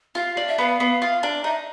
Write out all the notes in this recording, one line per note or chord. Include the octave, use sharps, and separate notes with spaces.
F4 F5
D4
E5
B3 F5
B3
F4
D4
D#4 E5